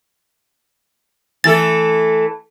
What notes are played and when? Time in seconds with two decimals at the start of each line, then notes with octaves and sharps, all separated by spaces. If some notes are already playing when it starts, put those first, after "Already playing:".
1.44 E3 A3 A4 A6